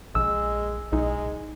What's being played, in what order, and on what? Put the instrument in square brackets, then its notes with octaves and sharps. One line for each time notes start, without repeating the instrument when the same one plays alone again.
[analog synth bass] A#1 [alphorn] G#3 [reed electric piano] E6
[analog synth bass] B1 [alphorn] G#3 [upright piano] D#4